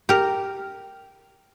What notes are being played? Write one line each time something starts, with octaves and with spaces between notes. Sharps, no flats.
G4 A#4